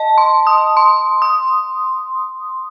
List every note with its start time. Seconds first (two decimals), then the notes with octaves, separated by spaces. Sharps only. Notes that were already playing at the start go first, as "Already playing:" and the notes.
Already playing: D#5 A5
0.18 C6
0.47 D#6
0.77 C6
1.22 D#6